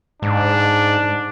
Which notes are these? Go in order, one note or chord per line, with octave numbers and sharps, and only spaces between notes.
G#2 D4